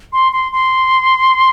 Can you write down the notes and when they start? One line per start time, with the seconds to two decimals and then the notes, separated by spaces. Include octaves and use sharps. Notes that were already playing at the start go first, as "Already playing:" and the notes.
0.13 C6
0.32 C6
0.52 C6